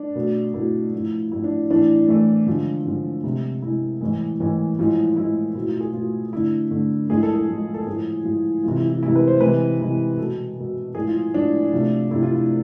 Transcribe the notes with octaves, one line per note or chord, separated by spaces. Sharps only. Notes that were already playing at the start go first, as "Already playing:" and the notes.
Already playing: D4
B2 A3
B2 A3 E4
A2 F3 A3
A2 F3 A3 E4
D4
A2 E3 A3 D4
A2 E3 A3
D3 F3 G#3
D3 F3 G#3
C3 G#3
C3 G#3 E4
A2 E3 G#3
A2 E3 G#3
A2 F3 G#3
A2 F3 G#3 E4
B2 A3 E4
F4
G#4
B2 A3 F4
D3 A3 E4
D3 A3
A2 F3 G#3 G#4
A4
A4
A2 F3 G#3
A4
A2 F3 G#3 G#4
A2 F3 G#3
C3 E3 G#3 F4
E4
E4
C3 E3 G#3 E4
B4
C5
C3 E3 G#3 B4
C3 E3 G#3
B2 G#3 A4
B2 G#3
A2 F3 G#3 G#4
F4
A2 F3 G#3 D4
C3 F3 A3
C3 F3 A3 E4
F4
E4